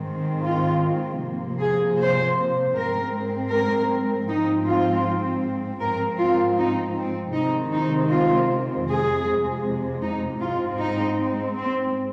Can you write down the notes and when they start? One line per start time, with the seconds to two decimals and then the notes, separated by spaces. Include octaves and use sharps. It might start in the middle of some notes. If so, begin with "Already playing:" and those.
Already playing: G#2 D#3 G#3 C4
0.45 F4
1.22 C3 F3 A#3
1.61 G#4
1.99 C5
2.75 G#2 G#3 C4 A#4
3.52 A#4
4.29 G#2 F3 C4 D#4
4.67 F4
5.82 G#2 F3 C4 A#4
6.20 F4
6.59 D#4
6.97 C4
7.35 C3 D#3 G#3 C4 D#4
7.73 D#4
8.11 F4
8.88 F2 C3 G#3 G#4
10.03 D#4
10.41 G#2 G#3 C4 F4
10.80 D#4
11.56 C4